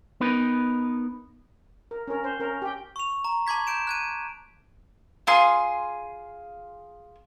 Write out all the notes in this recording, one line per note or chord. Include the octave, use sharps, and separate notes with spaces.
B3 D#4 A#4 B4
A#4
C#4 A#4
C5
C#4 A#4
G4 G5
C#6 F7
A#5
A5 C6 D6 G#6 B6
G6 D7 E7
F#6 G#6 D#7
F4 G#4 C6